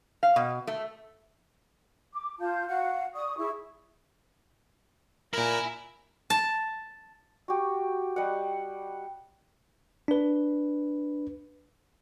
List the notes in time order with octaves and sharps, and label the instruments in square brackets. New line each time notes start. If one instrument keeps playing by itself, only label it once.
[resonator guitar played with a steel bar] F5
B2
A3
[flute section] D6
F4 A5 G6
F#4 F5 F#5
D5 C#6 D#6
E4 G#4 C#6
[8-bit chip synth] A#2 A#4 [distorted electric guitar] E4 [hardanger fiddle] G#5 A#5
[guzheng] A5
[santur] F#4 G4
G3 D#5 F#5
[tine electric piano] D4 B4